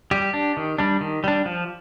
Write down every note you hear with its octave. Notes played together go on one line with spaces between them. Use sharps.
G3 G4
D4
D#3
G3 D4
D#3
G3 D4
F3